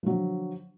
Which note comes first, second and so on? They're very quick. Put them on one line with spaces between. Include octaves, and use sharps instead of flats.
F3 F#3 D3